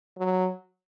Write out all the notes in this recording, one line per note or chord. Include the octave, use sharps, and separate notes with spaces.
F#3